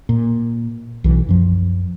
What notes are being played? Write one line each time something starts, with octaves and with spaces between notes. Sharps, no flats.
A#2
B1 E3
F#2 F3